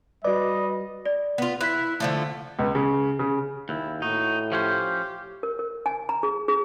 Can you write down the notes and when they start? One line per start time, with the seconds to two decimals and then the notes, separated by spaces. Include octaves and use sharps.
0.24 G3 F#4 B4 D5 D#5
1.05 D5
1.38 B3 F4
1.61 E4 F#6 B6
2.00 D3 F3 A3
2.59 C#2
2.75 C#3
3.19 C#3
3.69 D#2 E4
4.02 A2 D#4 F#4
4.52 F3 C#4 G4 C5
5.43 A#4
5.59 A#4
5.86 G#5
6.09 A#5
6.23 G#4
6.48 G#4